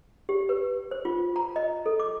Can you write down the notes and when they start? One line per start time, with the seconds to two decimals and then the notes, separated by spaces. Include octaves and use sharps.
0.29 G4
0.49 B4
0.91 C5
1.05 F4
1.36 A#5
1.56 D#5
1.86 A4
2.00 D6